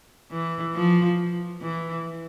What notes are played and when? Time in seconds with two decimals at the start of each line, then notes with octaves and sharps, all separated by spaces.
0.31 E3
0.75 F3
1.62 E3